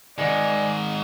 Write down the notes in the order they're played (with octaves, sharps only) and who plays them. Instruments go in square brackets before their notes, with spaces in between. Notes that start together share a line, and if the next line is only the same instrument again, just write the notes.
[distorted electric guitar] G#2 D#3 [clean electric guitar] G#3 [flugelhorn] D5